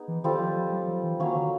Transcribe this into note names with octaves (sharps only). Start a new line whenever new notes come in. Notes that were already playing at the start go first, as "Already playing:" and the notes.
Already playing: B3 D#4 G#4
E3
D#3 G3 C4 F4 A4
F3
F3
F#3
F3
E3
D#3 F#3 A#3 C#4
D3